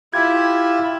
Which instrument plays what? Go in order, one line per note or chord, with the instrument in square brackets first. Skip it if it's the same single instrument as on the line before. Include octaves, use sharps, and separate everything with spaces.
[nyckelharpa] E4 [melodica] F4 G4 [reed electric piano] G#6